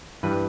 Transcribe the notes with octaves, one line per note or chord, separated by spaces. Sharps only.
G2 E3 G3 B4